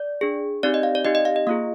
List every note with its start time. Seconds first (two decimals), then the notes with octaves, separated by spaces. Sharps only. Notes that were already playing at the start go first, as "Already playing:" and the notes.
Already playing: D5
0.21 D4 G#4
0.63 C4 D#4 G4 D5
0.74 D#5
0.83 F5
0.95 D5
1.05 C4 D#4 G4 D#5
1.15 D#5
1.25 F5
1.36 D#5
1.47 A#3 F4 G#4 F5